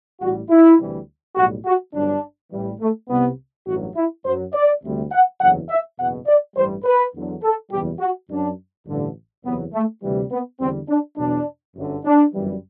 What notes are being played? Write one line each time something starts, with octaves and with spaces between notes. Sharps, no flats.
A1 A2 G3 F#4
E4
D2 C3 E3 G3
B1 A2 G3 F#4
F#4
G1 G2 F#3 D4
A1 A2 E3 G3
A3
C2 C3 G3 B3
A1 G2 F#3 F#4
E4
F#2 F#3 C5
D5
D2 C3 G3
F#5
F#1 E2 D3 F#3 F#5
E5
F#1 E2 B2 F#5
D5
A1 G2 E3 G3 C5
B4
E2 D3 F#3
A4
F#1 E2 B2 G3 G4
F#4
F#2 F#3 D4
A1 G2 D3
F#1 E2 C3 F#3 B3
A3
D2 C3 E3 G3
B3
E2 D3 G3 C4
D4
E2 B2 F#3 D4
G1 F#2 D3
D4
G1 F#2 E3 G3